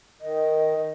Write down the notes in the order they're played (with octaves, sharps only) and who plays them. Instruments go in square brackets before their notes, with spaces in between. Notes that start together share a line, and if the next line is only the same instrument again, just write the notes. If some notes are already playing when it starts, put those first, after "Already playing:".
[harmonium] D#3 [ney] D#5